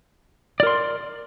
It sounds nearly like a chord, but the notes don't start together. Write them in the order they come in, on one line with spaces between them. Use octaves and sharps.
D5 A#4 C6